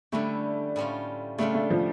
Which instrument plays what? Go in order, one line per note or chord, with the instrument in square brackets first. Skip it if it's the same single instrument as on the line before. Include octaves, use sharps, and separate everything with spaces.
[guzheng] D3 G3 C#4 E4 G4 [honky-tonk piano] A3
[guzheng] A2 G3 C#4 F4
[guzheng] C#3 G3 D4 F4 [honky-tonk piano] A3
[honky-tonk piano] A3
F3